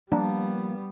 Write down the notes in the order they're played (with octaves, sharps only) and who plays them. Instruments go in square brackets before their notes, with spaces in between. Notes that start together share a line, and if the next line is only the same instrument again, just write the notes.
[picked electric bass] F3 A#3 [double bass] G3 B3 [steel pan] D4